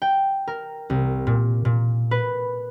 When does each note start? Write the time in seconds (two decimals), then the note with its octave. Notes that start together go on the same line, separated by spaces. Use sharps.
0.02 G5
0.48 A#4
0.90 C2
1.27 A#2
1.65 A#2
2.11 B4